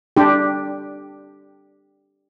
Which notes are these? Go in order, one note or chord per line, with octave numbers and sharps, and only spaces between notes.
D4 G4